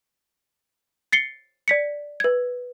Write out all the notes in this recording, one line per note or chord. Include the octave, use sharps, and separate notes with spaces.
A6 C7 C#7 G7
D5 B6 C#7
B4 G#6